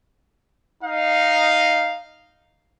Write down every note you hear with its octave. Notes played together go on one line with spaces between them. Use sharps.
D#4 F5